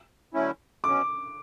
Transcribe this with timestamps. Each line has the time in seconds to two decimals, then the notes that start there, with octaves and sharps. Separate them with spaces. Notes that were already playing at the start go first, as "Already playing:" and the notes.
0.34 D3 F#3 A3 C#4 E4
0.84 B2 F#3 C#4 D6